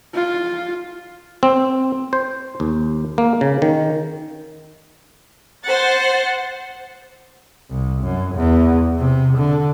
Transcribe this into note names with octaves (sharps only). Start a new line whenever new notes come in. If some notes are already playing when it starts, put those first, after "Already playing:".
F4
C4
C5
D#2
A#3
C#3
D#3
C5 F#5 A6
C2
F#2
E2
C3
D3